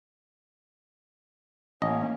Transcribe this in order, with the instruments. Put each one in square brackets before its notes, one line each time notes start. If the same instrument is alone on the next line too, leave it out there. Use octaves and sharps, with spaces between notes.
[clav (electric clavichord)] A1 D#5 [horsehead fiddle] A#3 C#4